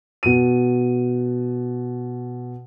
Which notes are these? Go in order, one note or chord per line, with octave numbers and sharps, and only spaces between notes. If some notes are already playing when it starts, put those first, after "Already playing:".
B2 D#7